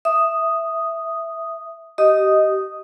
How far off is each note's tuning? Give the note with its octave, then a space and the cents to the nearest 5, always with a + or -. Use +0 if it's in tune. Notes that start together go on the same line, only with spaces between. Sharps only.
E5 +0 D#6 +0
G4 -25 D#5 +0 D#6 +0